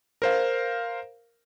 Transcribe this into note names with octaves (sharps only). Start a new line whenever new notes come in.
A#4 C5 F5